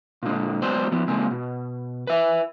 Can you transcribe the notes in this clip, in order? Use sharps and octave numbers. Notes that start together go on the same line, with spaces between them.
A#2 D3 G#3
F#3 G#3 B3 C5 D5
F3 B3
C#3 G#3 A#3 C4
B2
B4 E5